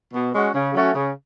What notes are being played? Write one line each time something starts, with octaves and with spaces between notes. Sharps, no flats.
B2
G#3 C#4 F#4
C#3
F#3 A3 C#4 F#4
C#3